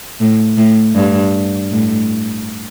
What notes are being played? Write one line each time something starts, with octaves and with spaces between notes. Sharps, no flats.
A2
A2
G2
A2